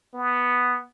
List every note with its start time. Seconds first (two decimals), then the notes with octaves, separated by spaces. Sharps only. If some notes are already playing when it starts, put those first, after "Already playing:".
0.14 B3